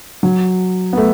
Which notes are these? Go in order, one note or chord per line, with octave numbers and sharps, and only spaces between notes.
F#3
B3
A3